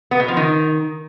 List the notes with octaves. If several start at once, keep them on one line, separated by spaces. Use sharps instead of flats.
B3
B2
F3
D#3